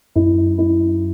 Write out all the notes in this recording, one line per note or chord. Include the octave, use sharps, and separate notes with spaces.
F#2 E4
E4